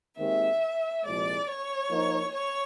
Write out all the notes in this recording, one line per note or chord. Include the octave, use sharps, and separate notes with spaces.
D#2 D#3 G#3 C4 E5
C2 A#2 F3 G#3 D5
C#5
F3 A#3 D#4
C#5